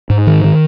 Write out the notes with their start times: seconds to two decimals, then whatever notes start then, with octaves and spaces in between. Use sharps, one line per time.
0.10 G#2
0.27 D#3
0.44 D#3